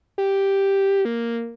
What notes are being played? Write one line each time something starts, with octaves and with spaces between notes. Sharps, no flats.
G4
A#3